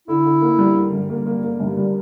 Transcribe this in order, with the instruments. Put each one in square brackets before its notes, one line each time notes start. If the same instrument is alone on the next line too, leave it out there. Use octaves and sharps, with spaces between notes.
[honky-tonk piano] D3 [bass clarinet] E4
[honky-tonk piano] D3
A#3
G3
G3
G2
A#3
A#3
A#3
G2
G3